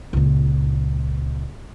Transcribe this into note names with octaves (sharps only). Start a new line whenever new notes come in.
C#2 A#2